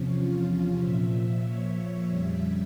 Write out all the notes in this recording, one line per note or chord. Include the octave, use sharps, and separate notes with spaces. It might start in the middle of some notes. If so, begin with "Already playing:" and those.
Already playing: E2 C3 F3 C#4
F4
A#2 F3 E5
C#5
C#5
F2 C#3 G3 E5